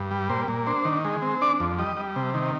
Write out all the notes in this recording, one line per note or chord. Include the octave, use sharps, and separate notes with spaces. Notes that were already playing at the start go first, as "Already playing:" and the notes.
Already playing: G2
G3
A#2 C5
A#2
D4 C5
D#3
G#3
C4
D4 D5
F2
G3 D#5
G3
C3
D#3